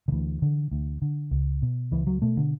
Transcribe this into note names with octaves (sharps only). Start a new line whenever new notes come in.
D3
D2 E3
D3
D2
D3
C#2
B2
C#2 E3
F#3
B2 A3
D3